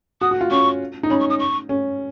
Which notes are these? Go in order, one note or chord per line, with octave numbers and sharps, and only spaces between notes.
F#4 D#6
F#4
F4
C#4 C#6
D#4
C#4 B5
C#6
D#6
C#6
C#4